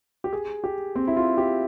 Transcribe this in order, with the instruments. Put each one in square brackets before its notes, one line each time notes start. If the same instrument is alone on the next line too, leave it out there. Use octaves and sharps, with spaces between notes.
[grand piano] G4
G#4
G4
C4
E4
F4
G4